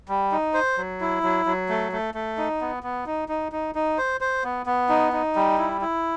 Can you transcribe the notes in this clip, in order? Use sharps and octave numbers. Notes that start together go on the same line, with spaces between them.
G3
D#4
C5
F#3
E4
F#3
F#3
A3
A3
A3
D#4
B3
B3
D#4
D#4
D#4
D#4
C5
C5
B3
B3
D#4
D#4
G3
E4
E4